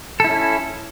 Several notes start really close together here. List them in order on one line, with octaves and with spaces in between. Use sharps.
A4 E4 C#4